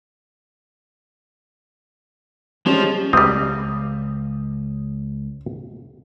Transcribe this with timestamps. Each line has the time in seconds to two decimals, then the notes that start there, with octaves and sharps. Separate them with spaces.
2.66 F3 G3 G#3 C#4
3.13 C#2 G3 C4 D#6